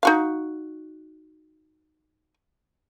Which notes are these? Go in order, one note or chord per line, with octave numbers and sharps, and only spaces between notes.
D#4 F#4 F5